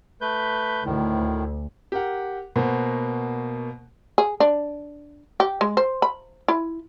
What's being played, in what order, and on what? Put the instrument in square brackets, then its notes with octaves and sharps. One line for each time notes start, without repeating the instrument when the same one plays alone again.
[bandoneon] A3 B4 G6
[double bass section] D2 [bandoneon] A2 D#3
[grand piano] G4 A#4 F#5
B2 A#3 F#4 C5
[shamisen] G#4
D4
G4
G#3
C5
B5
E4